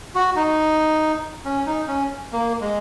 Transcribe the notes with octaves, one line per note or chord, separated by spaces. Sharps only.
F#4
D#4
C#4
D#4
C#4
A#3
G#3